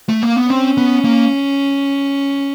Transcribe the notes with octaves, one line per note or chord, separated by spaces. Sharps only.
A3
A#3
B3
C4 C#4
B3
A#3